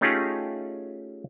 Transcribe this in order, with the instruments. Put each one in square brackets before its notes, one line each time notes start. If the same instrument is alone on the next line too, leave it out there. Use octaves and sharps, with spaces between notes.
[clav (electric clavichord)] A3 C#4 D#4 F4 G4 G#4